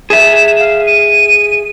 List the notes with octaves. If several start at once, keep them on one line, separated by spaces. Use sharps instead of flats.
G#4 E5 E7
F5
D#7